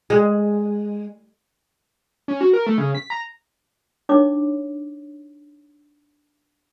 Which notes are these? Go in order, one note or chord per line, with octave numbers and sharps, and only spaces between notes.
G#3
C#4
F#4
A#4
A3
C#3
B6
A#5
D4 D#4 C#5 D6